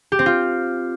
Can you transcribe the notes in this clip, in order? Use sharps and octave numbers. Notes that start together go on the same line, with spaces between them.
G4
C4
F4